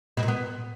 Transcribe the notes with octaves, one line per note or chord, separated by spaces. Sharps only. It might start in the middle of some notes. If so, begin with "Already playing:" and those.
B2
A#2
B3